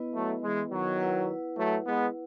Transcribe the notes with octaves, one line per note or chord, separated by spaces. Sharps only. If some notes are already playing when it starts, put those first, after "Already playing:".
Already playing: B3 E4 B4 D#5
F#3 A3
E3 G#3
D#3 F#3
E4 B4 F#5
F#3 A3
G#3 B3